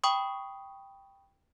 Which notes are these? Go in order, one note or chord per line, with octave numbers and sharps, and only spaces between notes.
G5 B5 C#6 D#6